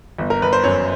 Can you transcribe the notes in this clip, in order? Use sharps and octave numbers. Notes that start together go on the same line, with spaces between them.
G1
A#4
G1 B4
C5
F#2 C#5